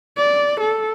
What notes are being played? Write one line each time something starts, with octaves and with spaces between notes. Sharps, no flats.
D5
A4